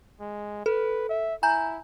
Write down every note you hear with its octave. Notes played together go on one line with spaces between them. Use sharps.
G#3
A4 B4
E5
E4 G#5 A#5 G6